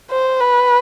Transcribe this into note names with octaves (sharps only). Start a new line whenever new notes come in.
C5
B4